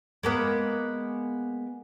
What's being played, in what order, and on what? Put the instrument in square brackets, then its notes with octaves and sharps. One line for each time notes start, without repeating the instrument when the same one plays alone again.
[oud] G#3 A#3 B3